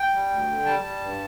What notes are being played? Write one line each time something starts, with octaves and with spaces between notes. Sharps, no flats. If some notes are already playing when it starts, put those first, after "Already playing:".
Already playing: G5
G3
D2
D3
G3 A5
G3
G2